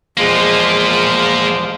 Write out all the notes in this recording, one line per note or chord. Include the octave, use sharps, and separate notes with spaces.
E2 F3 G#3 A#3 F4